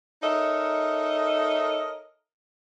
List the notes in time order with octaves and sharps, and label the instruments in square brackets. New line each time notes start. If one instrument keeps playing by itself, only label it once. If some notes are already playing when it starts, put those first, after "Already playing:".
[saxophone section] D#4 A4 A#4 C#5 D#5 E5